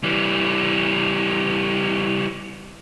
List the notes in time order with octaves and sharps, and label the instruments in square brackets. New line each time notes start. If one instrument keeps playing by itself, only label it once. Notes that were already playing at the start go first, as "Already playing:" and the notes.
[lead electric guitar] E3 G3